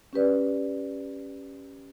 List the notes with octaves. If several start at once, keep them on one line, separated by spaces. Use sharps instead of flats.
C#4 G4 B4 D5